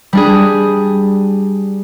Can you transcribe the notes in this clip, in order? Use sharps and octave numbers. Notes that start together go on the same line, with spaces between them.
G3 D4 G#4